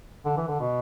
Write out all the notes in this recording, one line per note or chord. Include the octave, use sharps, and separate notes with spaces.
D3
E3
D3
B2